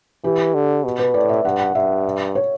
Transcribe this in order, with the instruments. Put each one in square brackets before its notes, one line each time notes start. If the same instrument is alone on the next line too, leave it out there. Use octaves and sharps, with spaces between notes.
[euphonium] E3 [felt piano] G4
[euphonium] D3
B2
[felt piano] B4
[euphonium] A2 [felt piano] D5
[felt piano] E5
[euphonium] G2 [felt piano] F#5
[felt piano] F#5
[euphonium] G2 [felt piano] E5
[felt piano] C#5